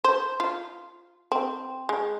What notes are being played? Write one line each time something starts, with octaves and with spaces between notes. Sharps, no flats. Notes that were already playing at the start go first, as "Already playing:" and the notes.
C5
F4
C4
G#3